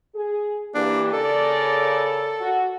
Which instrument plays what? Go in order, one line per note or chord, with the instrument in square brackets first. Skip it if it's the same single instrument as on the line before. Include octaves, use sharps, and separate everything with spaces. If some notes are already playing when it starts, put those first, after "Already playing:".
[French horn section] G#4
[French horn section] E3 A#3 G4 [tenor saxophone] D4
[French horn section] C#3 A#4 D5 [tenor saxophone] A4
[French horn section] F#4